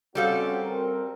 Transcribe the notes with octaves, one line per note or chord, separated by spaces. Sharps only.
G3 C4 C#4 F#4 A4 F5
C4 A#4